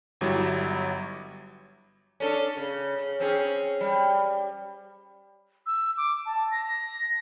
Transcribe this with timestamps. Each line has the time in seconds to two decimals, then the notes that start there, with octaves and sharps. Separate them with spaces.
0.21 G1 F#3 G3 E4
2.20 C#4 D4 A4
2.57 C#3
2.98 C#3
3.20 C4 C#4 G#4
3.81 G3
5.66 E6
5.97 D6
6.26 A5
6.51 A#6